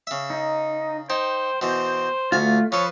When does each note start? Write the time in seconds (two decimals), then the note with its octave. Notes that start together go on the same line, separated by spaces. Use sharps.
0.07 C#3 E5
0.30 D#4
1.10 D#4 C5 G5
1.61 B2 E3 C5
2.32 D2 A3 F4 G#5
2.72 F3 A4 B4 C#5